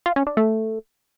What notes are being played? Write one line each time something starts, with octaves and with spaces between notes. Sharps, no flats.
F4
C#4
D4
A3